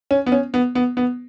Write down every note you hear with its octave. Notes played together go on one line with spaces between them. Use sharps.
C#4
B3
C#4
B3
B3
B3